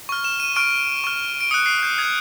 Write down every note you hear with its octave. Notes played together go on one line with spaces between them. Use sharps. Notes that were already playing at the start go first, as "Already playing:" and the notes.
C#6 F6
E7
D#7
C#6 F6 D7
C#6 F6
D7
D#6 F#6 C#7
C7
G6
D#6 F#6 G#6